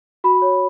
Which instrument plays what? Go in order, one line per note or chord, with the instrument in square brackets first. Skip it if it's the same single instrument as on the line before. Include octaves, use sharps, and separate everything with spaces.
[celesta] F#4 B5
C#5